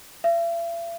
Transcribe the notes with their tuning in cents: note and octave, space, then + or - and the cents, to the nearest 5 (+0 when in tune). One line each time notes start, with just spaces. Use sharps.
E5 +45